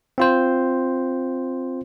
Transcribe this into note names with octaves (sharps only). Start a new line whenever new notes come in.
C4 F4 C5